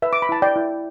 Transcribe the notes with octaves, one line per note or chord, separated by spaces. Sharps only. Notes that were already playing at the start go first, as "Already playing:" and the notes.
B4 E5
D6
B5
E4 A5
D5 G5
E4